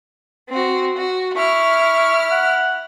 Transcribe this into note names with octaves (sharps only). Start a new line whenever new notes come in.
C4 F#4
F#4
E4 C#6 F6
F#5